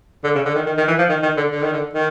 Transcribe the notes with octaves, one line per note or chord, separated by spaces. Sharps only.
D3
C#3
D3
D#3
D#3
D#3
E3
F3
D#3
D#3
D3
D3
D#3
D3
D#3